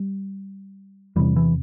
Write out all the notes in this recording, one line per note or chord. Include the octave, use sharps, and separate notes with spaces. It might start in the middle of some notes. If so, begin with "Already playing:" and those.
Already playing: G3
E2 C3 E3 G3
E3